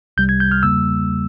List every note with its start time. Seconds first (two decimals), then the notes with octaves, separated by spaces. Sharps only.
0.17 C2 C3 G3 G6
0.29 G#6
0.40 G6
0.51 F6
0.63 E2 C#3 G3 A#3 E6